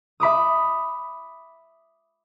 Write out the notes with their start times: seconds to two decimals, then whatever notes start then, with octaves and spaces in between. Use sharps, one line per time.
0.20 E5 B5 D6 D#6